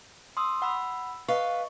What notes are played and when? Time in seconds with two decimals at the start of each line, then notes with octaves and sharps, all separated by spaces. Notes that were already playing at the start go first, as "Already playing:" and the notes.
0.37 C6 D#6 E6
0.62 F#5 B5 E6
1.28 B4 D#5 F5 C#6